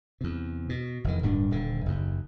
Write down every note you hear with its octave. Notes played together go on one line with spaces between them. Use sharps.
E2 C3
B2
F1 E2 D#3
D1 G2 C4 D4
D#1 D3
F#1 D#2